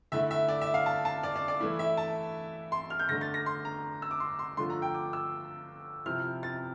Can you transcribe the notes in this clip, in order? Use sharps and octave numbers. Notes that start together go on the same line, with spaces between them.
D3 A3 E4 E5
E5
D5
E5
F5
A5
A5
D5
D5
D5
E3 A3 E4
E5
A5
C6
F6
G6
D3 A3 D4 A#6
A6
A#6
C6
A#5
E6
D6
C6
C6
D3 F3 A3 D4 F4 C6
A#5
G5
D6
E6
C3 F3 C4 E4 F6
A6